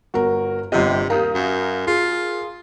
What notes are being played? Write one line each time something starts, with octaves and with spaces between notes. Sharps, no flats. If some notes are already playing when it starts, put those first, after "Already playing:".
G1 F#4 A#4
G1 C3 F4 G4 D#5
D#2 A#4 F5 A#5 D#6 G6
F#2
F4 G#4